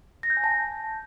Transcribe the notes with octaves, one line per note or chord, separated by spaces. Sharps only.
A#6
G6
G#5
A5